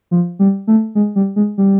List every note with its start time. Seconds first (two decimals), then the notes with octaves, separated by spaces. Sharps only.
0.11 F3
0.39 G3
0.67 A3
0.95 G#3
1.16 G3
1.36 G#3
1.58 G3